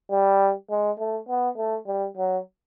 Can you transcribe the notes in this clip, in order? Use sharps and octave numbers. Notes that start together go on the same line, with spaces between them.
G3
G#3
A3
B3
A3
G3
F#3